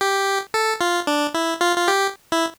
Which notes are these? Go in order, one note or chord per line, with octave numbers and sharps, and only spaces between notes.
G4
A4
F4
D4
E4
F4
F4
G4
E4